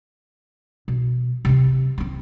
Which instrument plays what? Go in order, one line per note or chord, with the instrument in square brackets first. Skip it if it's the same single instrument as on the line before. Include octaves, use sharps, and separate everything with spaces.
[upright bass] B2
C3 C4
F3 C4